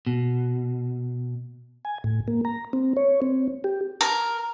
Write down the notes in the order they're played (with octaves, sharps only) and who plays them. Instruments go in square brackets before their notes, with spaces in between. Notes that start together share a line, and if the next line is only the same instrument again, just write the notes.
[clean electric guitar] B2
[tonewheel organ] G#5
A2
A#3
A#5
C4
C#5
C4
G4
[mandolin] A#4